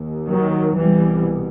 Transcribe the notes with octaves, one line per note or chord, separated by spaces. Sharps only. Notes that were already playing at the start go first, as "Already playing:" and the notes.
Already playing: D#2
D#3 F#3
C2 B2 E3 G3